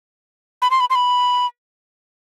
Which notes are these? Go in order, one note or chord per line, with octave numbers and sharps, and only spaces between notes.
B5
C6
B5
C6
B5